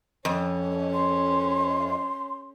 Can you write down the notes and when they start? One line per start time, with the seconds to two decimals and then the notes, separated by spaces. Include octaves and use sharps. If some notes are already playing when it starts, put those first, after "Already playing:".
0.25 F2 C#4
0.94 C6